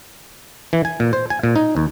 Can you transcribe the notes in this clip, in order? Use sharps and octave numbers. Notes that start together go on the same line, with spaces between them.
E3
G#5
A#2
C5
G#5
A#2
D#4
D#2